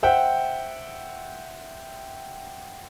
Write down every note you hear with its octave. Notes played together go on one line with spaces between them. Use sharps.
C5 E5 F#5 G5